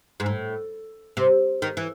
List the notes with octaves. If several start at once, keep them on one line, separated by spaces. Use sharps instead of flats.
G#2
A2
C3
D#3
E3